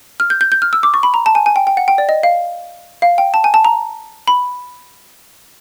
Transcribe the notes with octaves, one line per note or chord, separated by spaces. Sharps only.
F6
G6
G6
G6
F6
E6
D6
C#6
B5
A#5
A5
G#5
G#5
G5
G5
F#5
G5
D5
D#5
F5
F5
G5
A5
G#5
A5
A#5
B5